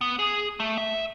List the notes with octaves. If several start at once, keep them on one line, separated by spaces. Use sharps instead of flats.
B3
G#4
A3
E5